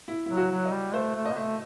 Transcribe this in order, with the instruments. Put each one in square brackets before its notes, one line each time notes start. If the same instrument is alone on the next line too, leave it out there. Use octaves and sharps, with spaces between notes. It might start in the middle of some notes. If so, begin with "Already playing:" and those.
[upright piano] E4
[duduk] F#3 [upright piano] E4
[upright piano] F#4
[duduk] F#3
[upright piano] D#5
[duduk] G3
[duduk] A3 [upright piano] C5
[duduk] A3
[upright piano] D#5
[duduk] B3
[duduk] A3 [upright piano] E5